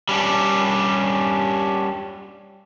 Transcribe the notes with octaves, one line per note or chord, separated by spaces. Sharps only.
G3 C#4 D4